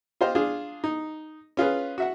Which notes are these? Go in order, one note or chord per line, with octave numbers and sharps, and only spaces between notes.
F4 G4 C5 D#5 F5
D4 F4 G#4
D#4
C#4 F4 G#4 B4
F#4 E5 F#5